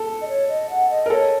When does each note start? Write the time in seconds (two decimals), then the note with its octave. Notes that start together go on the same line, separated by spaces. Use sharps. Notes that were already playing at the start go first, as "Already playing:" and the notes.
Already playing: A4
0.21 D#5
0.28 C#5
0.48 D#5
0.70 F#5
0.89 D#5
1.06 A#4
1.10 A4 C#5